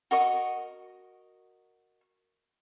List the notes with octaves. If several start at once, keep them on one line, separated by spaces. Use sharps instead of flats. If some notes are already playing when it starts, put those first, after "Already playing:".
F#4 A#4 D#5 C#6